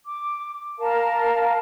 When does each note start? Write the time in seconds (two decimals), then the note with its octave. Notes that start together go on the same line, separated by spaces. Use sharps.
0.05 D6
0.79 A#4 F5 A5